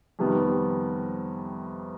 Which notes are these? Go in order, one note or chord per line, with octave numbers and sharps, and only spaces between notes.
F2 C3 D#3 G3 B3